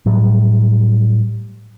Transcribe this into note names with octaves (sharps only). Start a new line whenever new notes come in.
A2 F#3 G3